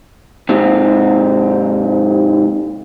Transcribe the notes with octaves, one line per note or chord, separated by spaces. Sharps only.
G#2 C3 C4